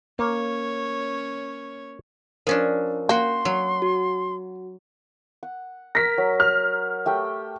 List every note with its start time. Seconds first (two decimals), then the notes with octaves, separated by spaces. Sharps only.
0.19 A#3 C#4 C#5
2.47 F3 C#4 D4 A#4
3.09 A#3 F#4 G5 C6
3.45 F#3
3.82 F#4
5.43 F#5
5.95 A#4 A#6 B6
6.18 F#3
6.40 F6
7.06 A3 G4 G5